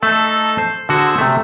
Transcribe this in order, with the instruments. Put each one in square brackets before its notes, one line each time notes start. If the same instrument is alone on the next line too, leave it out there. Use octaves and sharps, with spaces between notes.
[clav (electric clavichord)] A3 [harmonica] D#4 A4 A5
[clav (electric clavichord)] C5
[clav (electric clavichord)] D3 F#4 [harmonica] G#4 C5 E6
[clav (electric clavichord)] C3 A3